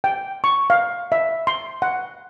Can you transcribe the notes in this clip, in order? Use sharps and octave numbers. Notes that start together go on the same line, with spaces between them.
G5
C#6
F5
E5
C6
F#5